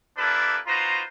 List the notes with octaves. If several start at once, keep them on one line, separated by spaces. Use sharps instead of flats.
A#3 D4 E4 G4 A4 B4
D#4 F4 F#4 B4 C5 A#5